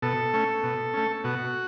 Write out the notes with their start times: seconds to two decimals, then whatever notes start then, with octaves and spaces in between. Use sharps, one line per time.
0.02 B2 A4
0.34 A3 C#4
0.63 B2
0.94 A3 C#4
1.24 B2 F#4